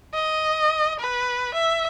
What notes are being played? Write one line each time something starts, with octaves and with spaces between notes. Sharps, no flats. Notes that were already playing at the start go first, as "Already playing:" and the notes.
D#5
B4
E5